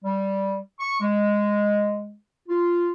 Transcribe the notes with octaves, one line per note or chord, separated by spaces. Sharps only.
G3
C#6
G#3
F4